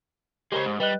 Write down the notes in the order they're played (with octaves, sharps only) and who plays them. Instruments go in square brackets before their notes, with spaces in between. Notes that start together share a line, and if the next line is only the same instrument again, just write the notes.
[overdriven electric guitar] C#3 G#3 [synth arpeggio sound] G4 A#4 C5
[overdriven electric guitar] G#2
[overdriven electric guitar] G3 [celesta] B4 D#5 F#6